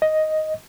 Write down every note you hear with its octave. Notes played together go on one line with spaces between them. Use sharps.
D#5